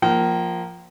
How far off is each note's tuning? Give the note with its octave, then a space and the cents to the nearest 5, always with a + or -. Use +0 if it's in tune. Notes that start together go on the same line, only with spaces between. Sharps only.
F3 +0 A#3 +0 G5 -35